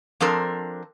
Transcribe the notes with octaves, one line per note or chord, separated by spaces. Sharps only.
F3 C4 D4 A4 A#4